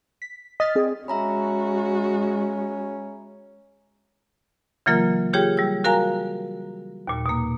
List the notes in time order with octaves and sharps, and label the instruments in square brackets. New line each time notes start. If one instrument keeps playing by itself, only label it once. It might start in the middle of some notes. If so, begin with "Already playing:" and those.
[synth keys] B6
[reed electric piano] D#5 [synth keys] F6 A6 B6
[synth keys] C4 G#4 D5
[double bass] G#3 [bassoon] C#4 [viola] F#4 [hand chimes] E5 A#5 B5
[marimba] C#3 E3 F#3 A#3 F4 A#4
F4 G4 G#4 C#5 G5
G3 E6
F#4 A#4 F5 G#5 A#5
D#2 A#2
B2 A#3